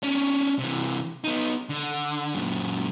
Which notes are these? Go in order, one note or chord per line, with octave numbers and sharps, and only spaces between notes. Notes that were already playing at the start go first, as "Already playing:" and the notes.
C#4 D4
C3 E3
B3 D#4
D3
F#2 A#2